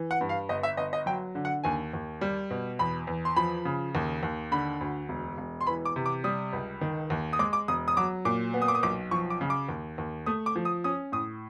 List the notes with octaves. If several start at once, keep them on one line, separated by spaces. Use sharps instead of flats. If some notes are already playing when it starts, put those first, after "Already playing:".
Already playing: E3
F#5
G2
F5
G1 D#5
E5
G1 D#5
D#5
F#3 G5
D3
F#5
D#2 G#5
D#2
G3
B2
E2 B5
E2
C6
F3 B5
C#3
D#2
D#2
D3 B5
D2
E1
E1
C6
E3 B5
D6
C3
D6
G3 D#6
C#2
D#3
D#2
D#6
G#3 D6
D6
E1 D#6
D#6
F#3 D6
A#2 D6
B3
D#6
D6
D#6
B1 D6
F3 C#6
D6
C#3
D6
D#2
D#2
A3 D#6
D6
F3
D#6
C#4 D#6
A2 D#6